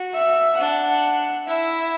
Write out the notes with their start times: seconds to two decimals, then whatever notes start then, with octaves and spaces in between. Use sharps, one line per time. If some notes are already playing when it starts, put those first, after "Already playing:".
Already playing: F#4
0.15 E5
0.58 D4 F#5
1.47 E4 E5